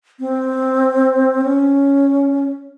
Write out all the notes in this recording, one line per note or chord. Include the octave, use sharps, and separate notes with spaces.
C4
C#4